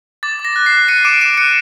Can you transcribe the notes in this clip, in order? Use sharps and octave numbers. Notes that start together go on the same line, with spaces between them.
D6 A6
D6
A#6
F#6
C7
F#6
F#6 C#7 D#7
D6 D7 E7
F#6 D7 E7
F#6 C#7 D#7